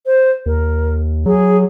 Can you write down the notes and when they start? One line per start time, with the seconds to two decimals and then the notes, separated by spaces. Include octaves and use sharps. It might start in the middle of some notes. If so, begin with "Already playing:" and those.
0.06 C5
0.46 D#2 A#4
1.26 F#3 G#4